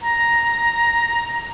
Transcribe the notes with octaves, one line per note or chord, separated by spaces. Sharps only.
A#5